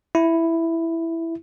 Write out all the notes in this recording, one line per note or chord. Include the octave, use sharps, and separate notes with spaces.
E4